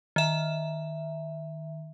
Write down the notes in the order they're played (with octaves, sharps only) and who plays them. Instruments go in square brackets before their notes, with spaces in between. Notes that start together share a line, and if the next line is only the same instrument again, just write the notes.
[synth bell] D#3 E5